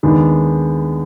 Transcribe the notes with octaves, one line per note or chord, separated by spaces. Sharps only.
D#2 D#3 G#3 B3 D4